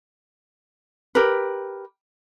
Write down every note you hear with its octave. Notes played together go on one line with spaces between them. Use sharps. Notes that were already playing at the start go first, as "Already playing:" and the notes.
G4 A#4 B4